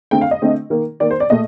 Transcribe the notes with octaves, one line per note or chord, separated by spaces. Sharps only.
D3 A3 C4 G5
F5
D#5
D3 A3 C4
D#3 A#3
D#3 A#3 D5
C5
D5
A#2 A3 D#5